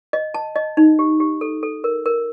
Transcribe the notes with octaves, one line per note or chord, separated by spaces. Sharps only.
D#5
A5
D#5
D#4
G4
G4
A4
A4
A#4
A#4